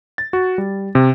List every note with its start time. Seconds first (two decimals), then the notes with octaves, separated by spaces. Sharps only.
0.18 A6
0.33 F#4
0.58 G3
0.95 C3